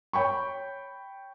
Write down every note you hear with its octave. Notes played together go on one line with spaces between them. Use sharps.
C#5 G5 B5 C#6